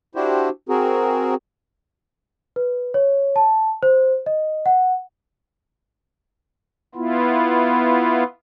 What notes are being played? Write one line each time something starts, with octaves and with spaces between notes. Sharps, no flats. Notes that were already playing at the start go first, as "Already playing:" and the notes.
D4 E4 F#4 G4 C5
C4 F#4 G#4 A#4
B4
C#5
A5
C5
D#5
F#5
B3 E4 F4